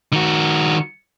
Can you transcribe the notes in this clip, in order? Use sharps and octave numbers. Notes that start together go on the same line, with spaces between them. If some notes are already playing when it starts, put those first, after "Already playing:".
D#3 F#4